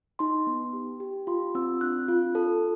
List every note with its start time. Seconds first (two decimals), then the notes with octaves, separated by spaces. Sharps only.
0.19 D#4 C6
0.47 B3
0.73 G4
1.00 G4
1.27 F4 C6
1.55 C4 E6
1.81 D4 F#6
2.08 F4
2.35 A4